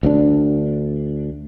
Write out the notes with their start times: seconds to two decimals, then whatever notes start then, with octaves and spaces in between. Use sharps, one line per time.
0.03 D2 B3 D4